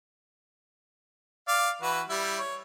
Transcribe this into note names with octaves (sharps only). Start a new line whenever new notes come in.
D5 F5
E3 F#4 B4
G3 E4
C#5